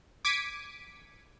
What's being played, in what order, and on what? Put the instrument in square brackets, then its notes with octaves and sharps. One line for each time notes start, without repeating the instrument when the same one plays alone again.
[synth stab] D6 G#6 B6 C#7 D#7